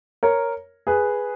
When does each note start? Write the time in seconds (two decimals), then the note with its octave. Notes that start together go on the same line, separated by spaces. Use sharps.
0.23 A#4 C#5
0.87 G#4 B4